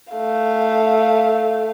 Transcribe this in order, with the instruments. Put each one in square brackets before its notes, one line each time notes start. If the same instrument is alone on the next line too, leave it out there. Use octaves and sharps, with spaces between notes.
[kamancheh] A3 F5